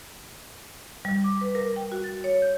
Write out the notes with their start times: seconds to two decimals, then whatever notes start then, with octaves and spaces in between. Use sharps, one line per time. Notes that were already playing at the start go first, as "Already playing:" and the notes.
1.05 G3
1.24 D6
1.41 B4
1.55 A#4
1.76 G5
1.92 F#4
2.04 A6
2.24 C#5
2.42 G6